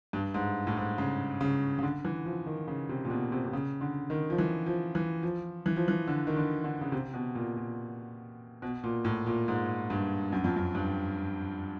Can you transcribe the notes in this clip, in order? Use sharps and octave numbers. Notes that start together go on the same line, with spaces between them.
G2
G#2
A2
G#2
C#3
C#3
C#3
D3
E3
F3
D#3
C#3
C3
A#2
B2
C3
C3
C#3
D3
D#3
F3
E3
F3
E3
F3
E3
F3
E3
D3
D#3
D3
D3
C#3
C3
B2
A#2
A#2
B2
A#2
A2
A#2
G#2
G2
F#2
F2
F#2
G2